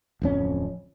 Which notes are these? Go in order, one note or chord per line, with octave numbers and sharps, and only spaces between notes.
D1 F2 C#4